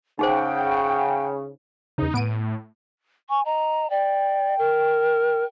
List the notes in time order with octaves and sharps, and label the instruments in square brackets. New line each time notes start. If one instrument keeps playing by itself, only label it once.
[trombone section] C#3 [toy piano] D#4 G#4 C5 [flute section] F#5 G5
[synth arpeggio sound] E2 C#3 [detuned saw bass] D#4
[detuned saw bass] A2 [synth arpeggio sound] B3 D7 D#7
[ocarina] G#5 [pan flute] C#6
[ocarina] D#5 [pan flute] A#5
[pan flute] D5 [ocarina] G5
[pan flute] A#4